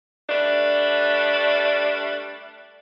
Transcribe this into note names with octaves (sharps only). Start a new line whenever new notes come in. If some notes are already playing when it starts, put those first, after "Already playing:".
G3 A3 D4 B4